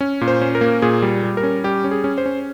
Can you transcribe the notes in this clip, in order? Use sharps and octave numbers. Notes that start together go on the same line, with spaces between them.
C#4
A#2
C5
C#4
A#4
A#3
A#2 G#4
G3
G3
A#4
C#4
G3 G4
C#4
G#4
C#4
C5
C#4